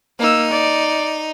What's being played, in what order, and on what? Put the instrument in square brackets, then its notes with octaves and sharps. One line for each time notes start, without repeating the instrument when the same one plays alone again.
[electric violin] A#3 E6 [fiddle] D#4
[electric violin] D5